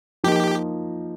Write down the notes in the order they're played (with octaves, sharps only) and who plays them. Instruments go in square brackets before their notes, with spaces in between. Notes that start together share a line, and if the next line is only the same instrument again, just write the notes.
[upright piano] F3 A#3 D#4 [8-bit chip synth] G4